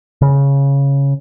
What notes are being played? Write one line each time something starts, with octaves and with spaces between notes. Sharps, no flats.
C#3